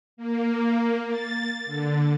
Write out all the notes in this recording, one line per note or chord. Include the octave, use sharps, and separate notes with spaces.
A#3
A6
D3